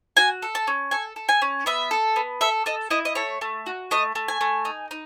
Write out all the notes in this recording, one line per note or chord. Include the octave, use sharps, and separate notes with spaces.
F#4 G#5
A4
A5
C#4
A4 G#5
A4
G#5
C#4
B3 E5
A4
B3
A4 E5
A4 D#5
E4 D#5
D#5
A3 C#5
A3
F#4
A3 D#5
A3
G#5
A3
D#4
D#4